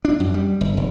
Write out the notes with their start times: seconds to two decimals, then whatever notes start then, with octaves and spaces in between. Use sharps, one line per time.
0.05 D4
0.20 F#2
0.34 G3
0.61 G1
0.77 F1